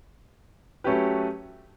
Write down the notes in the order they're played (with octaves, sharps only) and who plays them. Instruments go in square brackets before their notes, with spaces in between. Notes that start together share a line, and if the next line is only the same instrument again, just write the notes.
[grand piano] F#3 A3 C#4 G4 B4